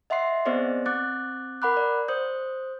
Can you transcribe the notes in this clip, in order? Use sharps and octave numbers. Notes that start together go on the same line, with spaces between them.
D#5 E5 F#5 C6 C7
B3 C4 G#4 C5 D5 D#5
C4 D6 F#6 A6
A#4 F#5 B5 D6 F#6
D5
C5 D#6 G6